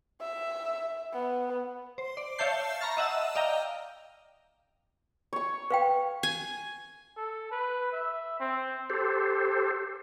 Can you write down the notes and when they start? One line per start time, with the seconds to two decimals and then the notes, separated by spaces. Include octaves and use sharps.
0.21 E5
1.13 B3
1.98 C5
2.17 D5
2.38 C#5 E5 F5 A5 G6 C7
2.81 A#5 B5 C#6 F6 A6
2.97 D#5 E5 F#5 A5 E6
3.35 D5 D#5 F5 G5 A#5
5.33 C#5 C#6
5.71 B4 F5 G5
6.23 G#5
7.17 A4
7.51 B4
7.92 E5
8.40 C4
8.90 G4 A4 C5